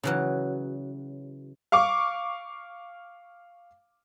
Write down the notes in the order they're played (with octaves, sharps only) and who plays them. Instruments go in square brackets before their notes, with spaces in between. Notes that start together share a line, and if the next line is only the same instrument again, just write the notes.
[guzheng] C#3 E3 F#3
[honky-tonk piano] F5 C#6 D6